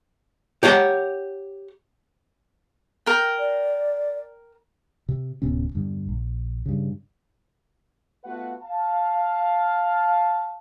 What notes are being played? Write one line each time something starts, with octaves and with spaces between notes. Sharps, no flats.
G4 C#5 F#5 G5
A#4 G5
D5
C3
D1 C3 B3 C#4
E2 G2 D3
A#1
G2 C#3
A3 B3 F4 F#4 B4 F#5
F5 A5